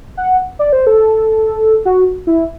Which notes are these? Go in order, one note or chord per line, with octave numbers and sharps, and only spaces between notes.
F#5
D5
C5
A4
F#4
E4